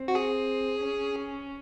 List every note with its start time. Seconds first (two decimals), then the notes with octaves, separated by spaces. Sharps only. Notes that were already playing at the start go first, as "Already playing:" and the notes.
Already playing: C4
0.08 F#4
0.15 G#4
0.78 C#4